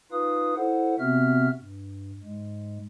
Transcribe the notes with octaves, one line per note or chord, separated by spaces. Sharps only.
D#4 F4 B4 F5 D#6
E4 A4 C5 F#5
C3 B3 C4 F#4 E5 F6
G2
G#2 G#3